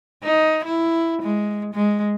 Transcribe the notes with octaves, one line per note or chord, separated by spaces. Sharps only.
D#4
E4
G#3
G#3